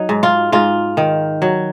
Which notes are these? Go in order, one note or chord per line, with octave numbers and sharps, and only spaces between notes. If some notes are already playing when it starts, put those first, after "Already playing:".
Already playing: F#3 D#4
G#2
F4
G#2 F4
D#3
F#3